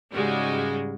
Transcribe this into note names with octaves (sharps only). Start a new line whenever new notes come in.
G#2 C#3 G3 G#3 F#4